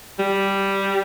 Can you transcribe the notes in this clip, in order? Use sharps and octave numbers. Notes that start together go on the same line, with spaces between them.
G3